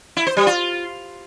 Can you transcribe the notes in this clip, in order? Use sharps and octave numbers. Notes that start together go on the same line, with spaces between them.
E4
C5
G3
F4